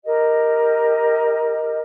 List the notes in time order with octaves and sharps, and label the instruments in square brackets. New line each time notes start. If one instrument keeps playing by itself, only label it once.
[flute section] G4 A#4 D#5